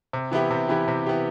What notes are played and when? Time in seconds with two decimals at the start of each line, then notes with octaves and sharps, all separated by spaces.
0.13 C3
0.32 E3 B3 E4 G4
0.51 C3
0.69 E3 B3 E4 G4
0.88 C3
1.06 E3 B3 E4 G4